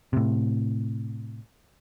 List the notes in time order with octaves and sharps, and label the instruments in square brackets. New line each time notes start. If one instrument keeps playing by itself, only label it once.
[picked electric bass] A2 C3